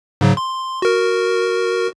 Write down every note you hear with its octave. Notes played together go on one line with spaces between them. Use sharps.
G#2 C#3 F#3
C6
F#4 A#4